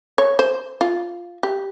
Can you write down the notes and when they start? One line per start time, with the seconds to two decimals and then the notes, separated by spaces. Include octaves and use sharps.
0.18 C#5
0.39 C5
0.81 F4
1.43 G4